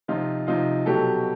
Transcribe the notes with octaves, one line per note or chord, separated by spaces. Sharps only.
C3 F3 D#4 F4
C3 F3 D#4 F4
B2 F#3 G4 A4